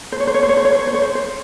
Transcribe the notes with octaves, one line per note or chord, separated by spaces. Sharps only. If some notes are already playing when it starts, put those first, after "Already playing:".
C5
C#5
C5
C#5
C5
C#5
C5
C#5
C5
C#5
C5
C#5
C5
C5